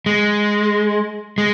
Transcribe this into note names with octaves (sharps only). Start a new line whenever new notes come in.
G#3
G#3